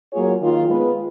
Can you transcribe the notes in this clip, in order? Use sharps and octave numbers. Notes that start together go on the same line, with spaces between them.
F#3 A#3 F4 G#4 C#5
D#3 A#3 F4
G#3 B3 F4 B4